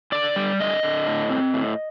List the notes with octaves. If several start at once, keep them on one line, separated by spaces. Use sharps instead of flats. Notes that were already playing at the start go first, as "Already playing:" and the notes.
D3 D5
G3
D3 D#5
D3
A2
C4
A2